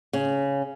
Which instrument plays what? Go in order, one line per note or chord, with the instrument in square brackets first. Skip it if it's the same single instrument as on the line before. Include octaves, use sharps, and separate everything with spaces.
[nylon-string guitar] C#3